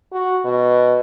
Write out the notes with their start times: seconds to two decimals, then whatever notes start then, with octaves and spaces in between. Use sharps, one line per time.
0.12 F#4
0.45 B2